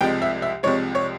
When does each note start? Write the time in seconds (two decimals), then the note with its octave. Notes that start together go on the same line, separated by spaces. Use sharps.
0.01 C2 C3 F3 G#3 G5
0.22 E5
0.42 E5
0.63 C2 C3 F3 G#3 C#5
0.95 C#5